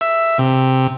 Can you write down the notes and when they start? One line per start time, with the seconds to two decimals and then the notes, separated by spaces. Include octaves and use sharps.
0.01 E5
0.38 C3